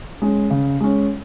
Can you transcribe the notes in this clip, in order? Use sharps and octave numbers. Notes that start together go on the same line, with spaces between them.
G#3 C#4
C#3
G#3 C#4